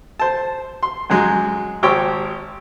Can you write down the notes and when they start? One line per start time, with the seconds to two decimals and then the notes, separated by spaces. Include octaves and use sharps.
0.20 C5 A5
0.83 C6
1.10 F#2 F#3 G#3
1.83 G#1 G4 C5 C#5 G5